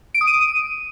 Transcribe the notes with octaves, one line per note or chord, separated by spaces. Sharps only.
D7
D#6
D#7